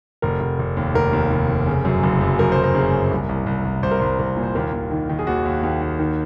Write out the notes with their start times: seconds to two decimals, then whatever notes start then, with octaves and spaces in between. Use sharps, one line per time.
0.22 F1 A#4
0.41 F1
0.59 F1
0.77 D#2
0.95 F1 A#4
1.13 D#2
1.31 F1
1.49 F1
1.67 C#3
1.85 F#2
2.03 F#1
2.21 F#2
2.39 F#2 A#4
2.52 F#1 C5
2.64 A#4
2.75 C#3
2.93 F#2
3.11 C2
3.29 C2
3.46 C2
3.65 C2
3.83 C2 C5
3.91 A#4
4.00 C2 C5
4.19 C2 A#4
4.37 A#2
4.43 C5
4.55 D#2 A#4
4.73 D#2
4.91 D#3
5.09 D#3
5.19 G#4
5.27 D#2 F#4
5.45 D#2
5.63 D#2
5.81 D#2
5.99 D#3